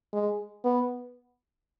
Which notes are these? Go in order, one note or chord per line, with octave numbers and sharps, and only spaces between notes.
G#3
B3